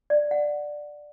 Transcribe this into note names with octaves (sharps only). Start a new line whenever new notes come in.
D5
F#5